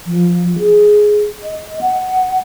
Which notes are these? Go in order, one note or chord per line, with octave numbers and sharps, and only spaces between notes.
F3
G#4
D#5
F#5